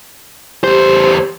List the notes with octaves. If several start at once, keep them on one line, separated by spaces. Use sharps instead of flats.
E2 G4 C5